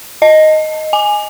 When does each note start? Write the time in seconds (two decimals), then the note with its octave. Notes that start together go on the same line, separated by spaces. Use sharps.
0.22 D#5
0.93 G#5